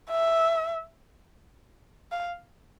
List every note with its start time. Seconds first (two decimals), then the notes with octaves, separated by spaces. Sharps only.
0.11 E5
2.12 F5